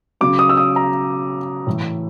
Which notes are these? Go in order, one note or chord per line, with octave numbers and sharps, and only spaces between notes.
C#3 F#3 D6
D#6
E6
D#6
A#5
A2 E3